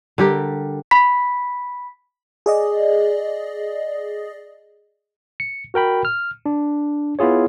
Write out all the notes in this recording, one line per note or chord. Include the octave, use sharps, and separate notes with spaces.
D3 G3 G4 A#4
B5 B6
G#4 D5 D#5
C#7
F#4 A#4 G5 B5
F6
D4
B3 E4 F4 G#4 C#5